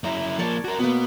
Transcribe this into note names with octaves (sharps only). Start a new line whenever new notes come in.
F#2 E4 A#5
F3 A#3 C#5 D5 A5
F#4 A#4
B2 A#3 B3